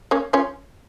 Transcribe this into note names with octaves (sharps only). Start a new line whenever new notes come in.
A#3 C#4
C#4 F4